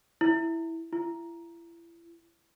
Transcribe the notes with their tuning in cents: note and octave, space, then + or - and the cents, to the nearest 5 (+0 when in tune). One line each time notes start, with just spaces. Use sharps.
E4 +0
E4 +35